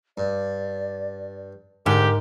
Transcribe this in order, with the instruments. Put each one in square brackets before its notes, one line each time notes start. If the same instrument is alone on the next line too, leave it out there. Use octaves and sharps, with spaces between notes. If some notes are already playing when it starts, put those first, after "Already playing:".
[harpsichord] G2 [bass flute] D5
[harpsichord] D2 D5 [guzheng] G#2 [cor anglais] G4 [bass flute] A#4